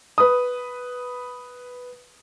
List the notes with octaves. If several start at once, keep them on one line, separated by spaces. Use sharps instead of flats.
B4 D#6